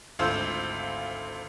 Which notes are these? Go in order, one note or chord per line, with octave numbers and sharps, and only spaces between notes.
G#1 D2 F4 C5 E6 G6